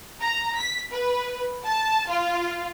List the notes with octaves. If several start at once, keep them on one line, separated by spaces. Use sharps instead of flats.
A#5
B6
B4
A5
F4